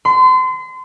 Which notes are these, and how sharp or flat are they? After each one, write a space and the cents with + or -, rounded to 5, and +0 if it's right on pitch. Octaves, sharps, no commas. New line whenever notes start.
C6 -35